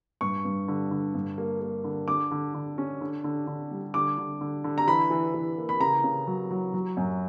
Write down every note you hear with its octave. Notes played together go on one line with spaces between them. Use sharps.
G2 C#6
G2
D3
D3
G2
A#3
A#3
D3
D3 D6
D3
D3
C#4
D3
D3
D3
G3
D3 D6
D3
D3
D3
A#5
E3 B5
E3
E3
A#3
B5
C#3 A#5
C#3
F#3
F#3
F#3
F#2